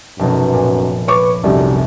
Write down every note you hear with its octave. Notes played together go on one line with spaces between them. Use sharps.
F1 F#2 B2
A#2
B4 C#5 C#6 D6 C#7
F1 C2 F#2 C3